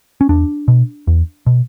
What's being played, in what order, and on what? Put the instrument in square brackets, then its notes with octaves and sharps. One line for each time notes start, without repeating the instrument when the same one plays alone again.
[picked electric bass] C#4
E2 D4
B2
E2
B2